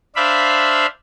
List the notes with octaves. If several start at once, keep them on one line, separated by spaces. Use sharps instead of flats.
D4 C5 D5 E5 F5 B5